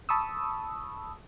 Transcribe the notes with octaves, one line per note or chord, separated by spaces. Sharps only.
A5 B5 C#6 D#6 E6